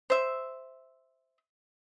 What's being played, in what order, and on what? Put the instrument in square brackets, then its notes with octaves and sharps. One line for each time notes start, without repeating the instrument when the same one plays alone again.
[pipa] C5 E5